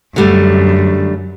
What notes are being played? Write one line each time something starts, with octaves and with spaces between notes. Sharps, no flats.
F#2 D3 G3 A3